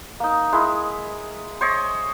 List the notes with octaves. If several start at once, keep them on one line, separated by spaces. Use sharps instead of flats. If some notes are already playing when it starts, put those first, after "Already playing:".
A#3 D#4
G#3 E4
C5 C#5 D#5